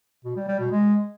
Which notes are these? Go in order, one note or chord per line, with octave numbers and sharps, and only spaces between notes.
B2
G3
G3
B2
G#3